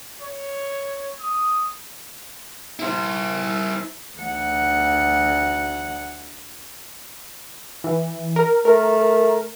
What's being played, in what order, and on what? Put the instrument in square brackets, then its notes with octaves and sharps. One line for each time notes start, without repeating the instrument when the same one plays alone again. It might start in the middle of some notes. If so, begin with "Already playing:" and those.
[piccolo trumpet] C#5
D#6
[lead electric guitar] E4 C5
[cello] D2 F#5
[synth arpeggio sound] E3
A#4
[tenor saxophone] A3 [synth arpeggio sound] A#4